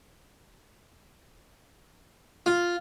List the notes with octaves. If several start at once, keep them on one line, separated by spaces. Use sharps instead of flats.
F4